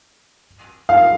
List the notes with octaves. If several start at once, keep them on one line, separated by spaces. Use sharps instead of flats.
F5